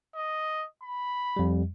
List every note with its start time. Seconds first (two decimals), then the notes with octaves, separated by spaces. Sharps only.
0.16 D#5
0.83 B5
1.36 F2 G3